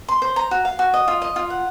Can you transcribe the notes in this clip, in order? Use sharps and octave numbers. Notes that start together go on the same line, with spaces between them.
C6
C5
A#5
F#4
F5
F#4
D#5
F4
D#5
F4
F#5